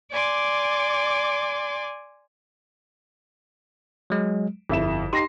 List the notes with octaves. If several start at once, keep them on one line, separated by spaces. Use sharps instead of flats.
D5 G#5 C6 D6
F#3 G#3
G1 F2 E4 E7
D#4 G4 C6 A#6 C7